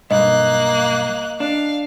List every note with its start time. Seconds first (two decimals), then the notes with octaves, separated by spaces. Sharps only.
0.11 B1 G2 A#3 D#5 F#6
1.40 D4 F5